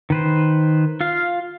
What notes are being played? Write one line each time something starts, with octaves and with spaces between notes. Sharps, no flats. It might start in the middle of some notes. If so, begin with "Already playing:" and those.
D#3 B4 C5
F4 F5